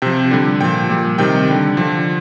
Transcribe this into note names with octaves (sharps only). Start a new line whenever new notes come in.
C3 F3 G5
D3 G3
A#2 F3 G5
A#2 G3
C3 D#3 G3 G5
D3 G3
D3 F3